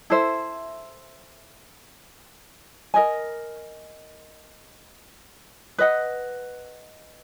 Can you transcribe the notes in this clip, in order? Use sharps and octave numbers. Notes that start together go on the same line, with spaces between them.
E4 A4 C5 E5
A#4 D#5 G#5
B4 D#5 F#5